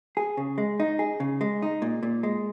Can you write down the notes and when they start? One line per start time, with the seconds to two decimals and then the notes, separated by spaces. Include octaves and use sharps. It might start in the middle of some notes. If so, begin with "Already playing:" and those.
0.17 G#4
0.37 C#3
0.58 G#3
0.80 D#4
0.99 G#4
1.20 C#3
1.41 G#3
1.62 D#4
1.82 A#2
2.03 A#2
2.23 G#3